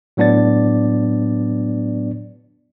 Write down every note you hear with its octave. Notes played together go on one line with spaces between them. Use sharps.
A2 F#3 B3 D4 D5 A6